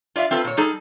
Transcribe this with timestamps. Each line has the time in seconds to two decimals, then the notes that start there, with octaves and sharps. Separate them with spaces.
0.16 F4 D5 E5 F5
0.31 C4 F4 A4 B4
0.44 A#2 C#5
0.57 G3 D#4 G#4 A4